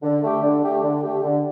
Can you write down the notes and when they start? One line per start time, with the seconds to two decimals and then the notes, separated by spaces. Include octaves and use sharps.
0.03 D3
0.22 A3 G4
0.43 D3
0.62 A3 G4
0.83 D3
1.02 A3 G4
1.23 D3